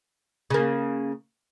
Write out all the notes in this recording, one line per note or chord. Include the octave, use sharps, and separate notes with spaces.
C#3 A#3